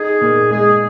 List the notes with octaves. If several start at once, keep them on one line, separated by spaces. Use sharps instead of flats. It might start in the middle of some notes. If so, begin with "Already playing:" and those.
Already playing: D#4 G#4
A#2
G#3 G#4